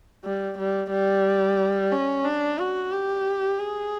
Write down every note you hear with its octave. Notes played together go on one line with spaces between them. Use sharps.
G3
G3
G3
C#4
D4
F#4
G4
G#4